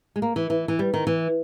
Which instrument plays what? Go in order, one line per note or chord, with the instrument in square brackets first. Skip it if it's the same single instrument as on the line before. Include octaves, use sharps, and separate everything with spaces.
[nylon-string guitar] G#3
A#3
E3
E3
E3
G3
D#3
E3